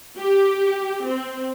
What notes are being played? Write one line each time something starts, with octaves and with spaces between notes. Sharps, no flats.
G4
C4